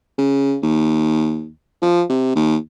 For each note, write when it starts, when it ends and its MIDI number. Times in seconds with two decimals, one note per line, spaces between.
0.18 0.57 49
0.62 1.48 39
1.82 2.03 53
2.09 2.32 48
2.36 2.56 39